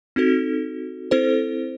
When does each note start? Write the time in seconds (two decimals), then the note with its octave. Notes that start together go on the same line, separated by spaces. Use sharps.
0.16 C4 D#4 F#4 A4
1.11 C4 E4 A4 C5